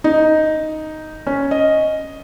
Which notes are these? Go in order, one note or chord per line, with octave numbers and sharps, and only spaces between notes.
D#4
C#4
D#5